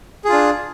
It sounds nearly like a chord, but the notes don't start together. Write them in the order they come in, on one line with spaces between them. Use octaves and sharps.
G#4 F4 D4